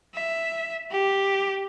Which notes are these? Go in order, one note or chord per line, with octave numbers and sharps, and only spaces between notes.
E5
G4